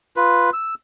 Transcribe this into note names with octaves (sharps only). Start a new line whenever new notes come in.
F4 B4
E6